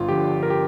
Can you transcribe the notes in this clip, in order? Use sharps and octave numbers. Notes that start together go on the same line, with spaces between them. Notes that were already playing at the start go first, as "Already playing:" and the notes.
Already playing: G1 F4
G2 D3 F3 G4
A#4
G4